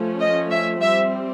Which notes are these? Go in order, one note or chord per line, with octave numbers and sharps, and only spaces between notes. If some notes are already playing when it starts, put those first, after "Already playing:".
Already playing: F3 A3 C#4
D#5
E5
G3 C4 E5